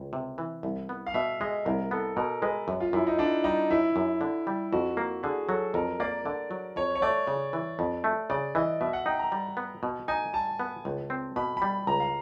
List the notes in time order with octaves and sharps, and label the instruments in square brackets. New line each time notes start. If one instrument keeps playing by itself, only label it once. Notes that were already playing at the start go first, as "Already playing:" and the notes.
Already playing: [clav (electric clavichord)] C#2
C3
E3
C2
B3
[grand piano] F5
[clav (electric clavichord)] B2 [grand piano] E5
[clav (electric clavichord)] G#3 [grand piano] D#5
[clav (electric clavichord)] C2 [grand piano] A#4
[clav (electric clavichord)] B3 [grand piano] A4
[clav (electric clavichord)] B2 [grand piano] A#4
[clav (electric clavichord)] G#3 [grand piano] B4
[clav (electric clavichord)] F#2
[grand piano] F4
[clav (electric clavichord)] F#2 [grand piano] E4
[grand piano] D#4
[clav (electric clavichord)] D3 [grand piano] D4
[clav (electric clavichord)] G3 [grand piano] D#4
[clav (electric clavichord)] F#2 [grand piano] E4
[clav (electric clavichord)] F#2
D3
G3
[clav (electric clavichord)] F2 [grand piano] F#4
[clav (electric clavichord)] A#3
[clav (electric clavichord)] D3 [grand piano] G#4
[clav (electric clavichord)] F#3 [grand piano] A4
[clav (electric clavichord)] F2 [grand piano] A#4
[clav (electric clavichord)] A#3 [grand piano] D5
[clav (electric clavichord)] D3 [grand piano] D5
[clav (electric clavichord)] F#3
[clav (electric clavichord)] F2 [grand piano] C#5
[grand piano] C#5
[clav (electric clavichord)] A3 [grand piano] D5
[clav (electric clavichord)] C#3
E3
F2
A3
[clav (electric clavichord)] C#3 [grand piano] D5
[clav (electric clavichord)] E3 [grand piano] D#5
[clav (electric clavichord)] B2 [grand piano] E5
[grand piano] F#5
[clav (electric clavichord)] D#4 [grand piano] G5
[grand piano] A#5
[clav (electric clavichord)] G3
B3
B2
[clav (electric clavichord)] D#4 [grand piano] G#5
[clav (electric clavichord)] G3 [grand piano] A5
[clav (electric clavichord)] B3
C#2
C4
[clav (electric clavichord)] B2 [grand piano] B5
[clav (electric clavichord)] G3 [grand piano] B5
[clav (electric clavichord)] C#2 [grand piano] A#5
[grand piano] F5